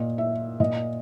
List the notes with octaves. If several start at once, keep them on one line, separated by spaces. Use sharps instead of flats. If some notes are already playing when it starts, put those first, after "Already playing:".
Already playing: A#2 D#5
E5
A#2 D#5